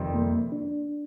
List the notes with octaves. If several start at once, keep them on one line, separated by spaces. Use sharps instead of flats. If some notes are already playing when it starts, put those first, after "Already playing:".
Already playing: F2 C3 D#3 G3 C4
A#3
D4